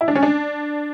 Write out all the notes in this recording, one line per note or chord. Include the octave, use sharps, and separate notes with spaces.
E4
D4
C#4
D4